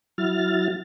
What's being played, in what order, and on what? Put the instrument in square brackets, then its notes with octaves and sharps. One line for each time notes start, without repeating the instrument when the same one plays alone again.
[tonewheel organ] F#3 E4 F6 A6